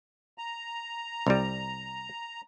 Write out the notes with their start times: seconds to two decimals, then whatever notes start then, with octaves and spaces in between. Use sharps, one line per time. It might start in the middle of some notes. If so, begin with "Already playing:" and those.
0.38 A#5
1.27 C2 G3